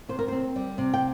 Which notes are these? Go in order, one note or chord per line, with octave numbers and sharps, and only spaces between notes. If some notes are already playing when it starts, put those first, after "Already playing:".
C3 C5
A#4
C5
C4
G3
C3
G5